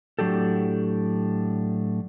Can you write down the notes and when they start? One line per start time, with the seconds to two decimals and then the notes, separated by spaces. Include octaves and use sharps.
0.19 A2 F#3 D4 G4 A4